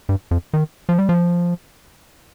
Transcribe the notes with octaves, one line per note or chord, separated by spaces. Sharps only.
G2
F2
D#3
F3
G3
F3